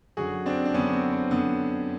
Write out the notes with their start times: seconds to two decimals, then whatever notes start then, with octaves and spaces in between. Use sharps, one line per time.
0.17 F#2 D3 F#4 G#4
0.46 C4 D4
0.65 D4
0.74 F#2 D3 B3 C#4
0.93 C4
1.12 C4
1.31 F#2 D3 B3